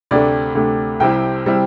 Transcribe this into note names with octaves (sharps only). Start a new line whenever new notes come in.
D2 C3 A3 D5
D2 C3 A3
C2 C3 G3 C4 E4 G5
C3 G3 C4 E4